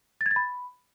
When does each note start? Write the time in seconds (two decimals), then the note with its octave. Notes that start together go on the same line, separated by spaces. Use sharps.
0.21 A6
0.26 G#6
0.31 A6
0.36 B5